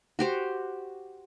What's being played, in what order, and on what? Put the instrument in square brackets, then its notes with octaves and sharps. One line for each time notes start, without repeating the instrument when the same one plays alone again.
[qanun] F#4 G4 C5